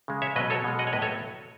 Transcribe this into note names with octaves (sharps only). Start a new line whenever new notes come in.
C#3 G#3
C#5 E5
B2 F#3 B4 D#5
A4 C#5
B2 G#3
D#5 F#5
C#5
A2 F#3 B4 D#5
A4 C#5